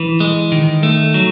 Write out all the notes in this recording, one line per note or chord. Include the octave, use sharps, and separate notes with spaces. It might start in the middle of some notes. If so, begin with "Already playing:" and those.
Already playing: E3
G#3
D#3
A3
F#3